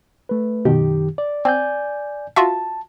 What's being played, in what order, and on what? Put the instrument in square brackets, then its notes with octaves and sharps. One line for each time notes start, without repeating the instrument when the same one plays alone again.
[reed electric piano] A3 B4
[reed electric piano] F#2 D#3 G4 [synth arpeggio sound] B2
[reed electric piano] D5
[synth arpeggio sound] C4 [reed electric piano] D5 G#5 G6
[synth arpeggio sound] F4 F#4 E5 [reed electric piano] A5